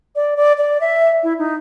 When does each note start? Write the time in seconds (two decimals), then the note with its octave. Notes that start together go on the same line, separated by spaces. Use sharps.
0.16 D5
0.37 D5
0.58 D5
0.81 E5
1.23 E4
1.39 D#4